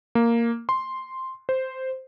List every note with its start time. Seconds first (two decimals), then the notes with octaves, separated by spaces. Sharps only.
0.15 A#3
0.69 C6
1.49 C5